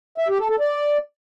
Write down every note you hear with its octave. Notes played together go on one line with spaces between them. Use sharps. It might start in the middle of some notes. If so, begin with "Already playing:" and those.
E5
G4
A4
A4
D5